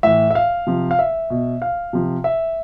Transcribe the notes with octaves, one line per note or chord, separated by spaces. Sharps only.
A2 E3 E5
E5
F5
C3 F3
F5
E5
B2
F5
C3 F3
E5